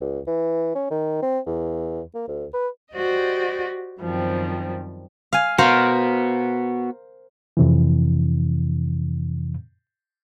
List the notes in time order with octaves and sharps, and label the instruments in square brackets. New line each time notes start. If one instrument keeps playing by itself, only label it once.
[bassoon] C#2
E3
C#4
D#3
C4
E2
A#3
D2
B4
[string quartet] F#4 G4 C5 D5 D#5
F#2 D#3 F3 G3 C4
[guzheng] F5 G#5
[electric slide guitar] B3 F#4 [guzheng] A#4 C5 F5
[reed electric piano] F2 C3 E3